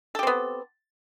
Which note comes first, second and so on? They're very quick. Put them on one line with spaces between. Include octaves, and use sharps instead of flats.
A4 G4 C4 B3